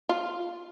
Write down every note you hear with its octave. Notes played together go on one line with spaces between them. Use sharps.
F4